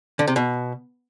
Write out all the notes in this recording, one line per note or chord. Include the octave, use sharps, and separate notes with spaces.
D3
C3
B2